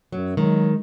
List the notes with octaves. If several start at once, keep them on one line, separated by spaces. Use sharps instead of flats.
F#2 F#3
D#3 F#3 G#3